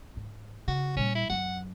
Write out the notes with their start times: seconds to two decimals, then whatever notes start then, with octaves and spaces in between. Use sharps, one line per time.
0.17 G#2
0.68 C#3 F#4
0.97 A#2 G3 C#4
1.15 E4
1.30 F#2 F#3 F#5